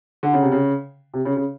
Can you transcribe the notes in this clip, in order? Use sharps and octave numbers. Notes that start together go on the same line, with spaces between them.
D3
C#3
C3
C#3
C3
C#3
C#3